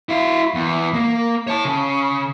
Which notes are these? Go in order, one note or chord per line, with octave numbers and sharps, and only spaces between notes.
E4 F5
E2
A#3
C#5 A5
C#3